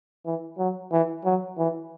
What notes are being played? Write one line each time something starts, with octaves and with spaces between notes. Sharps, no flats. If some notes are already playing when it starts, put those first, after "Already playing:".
E3
F#3
E3
F#3
E3